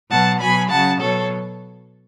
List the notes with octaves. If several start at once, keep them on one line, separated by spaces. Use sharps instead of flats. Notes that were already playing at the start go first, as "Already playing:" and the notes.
B2 F#3 F#5 A5
B2 F#3 G#5 B5
C#3 F#3 F#5 A5
B2 F#3 A4 C#5